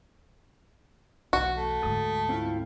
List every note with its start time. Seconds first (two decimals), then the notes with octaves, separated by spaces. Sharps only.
1.33 B1 E2 F#4
1.57 A3
1.82 D2 G#2 A4 D#6
2.29 C4 E4 F4